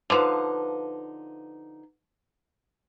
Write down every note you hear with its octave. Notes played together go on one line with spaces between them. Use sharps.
D3 F3 D#4 B4 F5